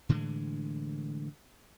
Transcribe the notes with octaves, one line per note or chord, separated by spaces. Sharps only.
A2 D3 E3 G#3